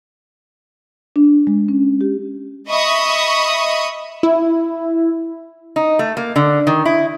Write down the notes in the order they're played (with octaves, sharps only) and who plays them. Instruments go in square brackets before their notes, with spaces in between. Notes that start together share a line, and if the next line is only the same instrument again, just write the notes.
[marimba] D4
G#3
C#4
G4
[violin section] D#5 E5 B5 C#6 D#6
[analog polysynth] E4
[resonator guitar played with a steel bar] D#4
A3
A#3
D3
D#3
E4